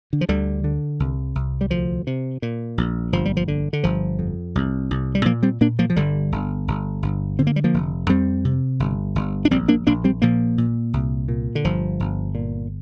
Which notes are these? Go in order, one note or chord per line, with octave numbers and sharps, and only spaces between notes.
D3
F3
D2 D3 G3
D3
C2
C2
G3
D2 F3
C3
A#2
A#1
G1 F3
G3
F3
D3
D3
G1 F3
F2
C2
C2
G3
A#2 F3 A#3
G3 C4
A#2 A#3 D4
F3 A#3
F3
G1 D3 G3
G1
G1
G1
D3 C4
A#3
G3
F3 A#3
F1
F2 G3 C4
C3
G1
G1
D4
A#1 G3 C4
A#3 D4
A#1 A#3 D4
G3 C4
A#2 F3 A#3
A#2
C2
A#2
D3
G1 F3
G1
A#2